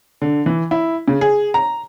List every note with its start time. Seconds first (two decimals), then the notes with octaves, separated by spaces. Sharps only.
0.22 D3
0.46 E3
0.71 E4
1.08 C#3
1.21 G#4
1.54 A#5